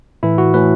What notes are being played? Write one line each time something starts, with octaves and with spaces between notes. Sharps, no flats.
A2 E3 E4
F#4
A2 E3 B4